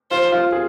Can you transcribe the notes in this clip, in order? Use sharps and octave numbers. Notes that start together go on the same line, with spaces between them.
F4 C5
F4
G#4